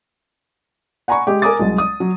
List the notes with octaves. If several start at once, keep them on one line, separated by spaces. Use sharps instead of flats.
F#5 G#5 A#5 B5 C#6
G#3 G4
A#4 G#5 A#5 D6 D#6 A6
C2 F#3 G#3
D#6
F#3